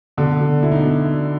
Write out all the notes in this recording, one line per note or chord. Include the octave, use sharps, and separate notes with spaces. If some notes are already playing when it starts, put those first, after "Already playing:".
B2 D3 D4
B2
B2 E4
D#4
D4
B2